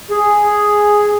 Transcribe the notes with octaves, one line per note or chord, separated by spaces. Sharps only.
G#4